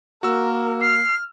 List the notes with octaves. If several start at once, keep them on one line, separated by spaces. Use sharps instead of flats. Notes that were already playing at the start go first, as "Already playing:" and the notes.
A#3 F#4 A#4 E6
F6 C7